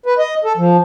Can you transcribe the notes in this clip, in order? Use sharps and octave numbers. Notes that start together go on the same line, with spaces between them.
B4
D#5
A4
F3